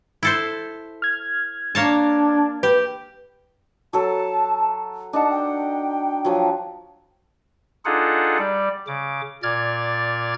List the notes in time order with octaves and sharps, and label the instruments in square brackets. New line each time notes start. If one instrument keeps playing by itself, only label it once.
[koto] E4 A4 C5
[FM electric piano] F6 G#6
[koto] A#3 C#5 A5 [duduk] D4
[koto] G4 [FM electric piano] B4
[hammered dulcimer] F#3 A4 [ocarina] A5
[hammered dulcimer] D4 D#4 F#5 [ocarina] A5
[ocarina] G5
[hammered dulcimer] F3 F#3
[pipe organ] D4 D#4 F4 G#4 A4 F#5
G3 D5
C#3 D6
A#2 D5 F6 G#6 A6